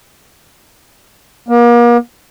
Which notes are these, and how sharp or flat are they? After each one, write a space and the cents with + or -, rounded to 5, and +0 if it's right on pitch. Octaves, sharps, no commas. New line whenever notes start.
A#3 +40